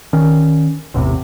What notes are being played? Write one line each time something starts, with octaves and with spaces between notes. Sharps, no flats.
D#3 C#4
A1 E2 A2 C3